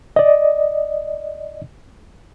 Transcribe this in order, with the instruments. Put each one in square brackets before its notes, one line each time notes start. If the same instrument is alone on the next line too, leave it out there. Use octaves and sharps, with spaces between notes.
[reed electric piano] D5 D#5